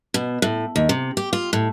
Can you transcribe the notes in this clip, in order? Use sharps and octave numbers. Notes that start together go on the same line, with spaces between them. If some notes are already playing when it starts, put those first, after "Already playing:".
B2
A2
D#2
C3
G4
F4
A2